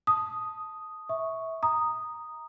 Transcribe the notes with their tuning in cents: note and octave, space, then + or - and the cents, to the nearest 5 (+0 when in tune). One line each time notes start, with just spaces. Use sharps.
A5 +0 D#6 +0
E5 -20 C#6 +0
A#5 +0 D#6 -5